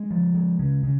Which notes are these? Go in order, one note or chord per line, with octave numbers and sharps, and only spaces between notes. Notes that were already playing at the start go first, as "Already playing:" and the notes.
Already playing: G#3
F3
G#3
C#3
C#3